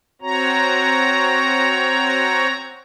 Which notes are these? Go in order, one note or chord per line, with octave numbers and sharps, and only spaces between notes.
C4 F#4 C#5 A#5